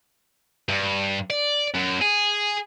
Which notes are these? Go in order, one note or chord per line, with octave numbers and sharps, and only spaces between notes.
G2
D5
F#2
G#4